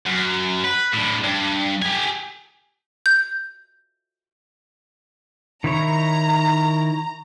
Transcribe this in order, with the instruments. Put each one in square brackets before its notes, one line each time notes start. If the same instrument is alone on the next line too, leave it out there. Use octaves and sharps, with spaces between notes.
[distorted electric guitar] F#2
B4
A2 D3
G2
G4 G#5
[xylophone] G6
[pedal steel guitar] D#3 E4 C#5 [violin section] A#5